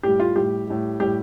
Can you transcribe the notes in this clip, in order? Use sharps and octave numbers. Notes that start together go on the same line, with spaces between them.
A2 G3 G4
F4
A2 G3 G4
A2 G3
A2 G3 G4